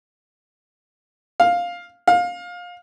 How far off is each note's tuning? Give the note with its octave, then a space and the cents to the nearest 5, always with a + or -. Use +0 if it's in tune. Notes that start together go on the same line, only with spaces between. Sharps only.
F5 +5
F5 +20